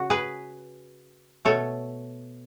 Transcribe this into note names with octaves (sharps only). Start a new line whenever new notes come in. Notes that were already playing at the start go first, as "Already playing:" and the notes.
Already playing: C#3 F#4
G#4 B4
B2 A3 A4 C#5